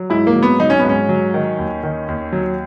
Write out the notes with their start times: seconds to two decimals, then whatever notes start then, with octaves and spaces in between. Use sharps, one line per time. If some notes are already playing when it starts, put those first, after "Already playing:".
Already playing: F#3
0.10 G#2 E4
0.27 A#3
0.35 F#3
0.43 B3
0.59 F#3 D#4
0.70 C#4
0.79 B3
0.85 G#2 C#4
1.09 F#3
1.34 D#3
1.58 D#2
1.83 D#3
2.08 D#2
2.33 F#3